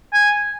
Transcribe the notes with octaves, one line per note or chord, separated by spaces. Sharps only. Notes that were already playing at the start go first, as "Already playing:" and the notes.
G#5